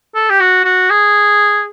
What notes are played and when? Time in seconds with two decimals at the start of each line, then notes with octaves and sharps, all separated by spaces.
0.15 A4
0.30 G4
0.40 F#4
0.64 F#4
0.90 G#4